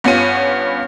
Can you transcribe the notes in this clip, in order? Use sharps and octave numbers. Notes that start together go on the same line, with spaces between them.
G2 B3 C#4 F4 D#7